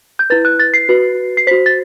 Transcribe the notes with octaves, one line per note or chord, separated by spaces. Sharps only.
G6
E4 B4 A6
F#6
A6
C7
F#4 B4
C7
F#4 C5 B6
A6